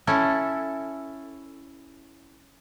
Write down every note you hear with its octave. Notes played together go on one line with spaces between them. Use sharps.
C#4 E4 A4